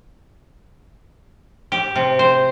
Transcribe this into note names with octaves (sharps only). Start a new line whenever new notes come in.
G4
C3
C5